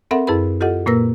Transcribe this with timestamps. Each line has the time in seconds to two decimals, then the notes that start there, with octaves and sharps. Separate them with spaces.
0.11 C4 A4 A#4 E5 F#5 B5
0.27 F#2 E4 G#4 B4 B5
0.61 F4 G4 A4 D#5 F#5
0.86 A#2 A#3 A#4 B4 E6 A#6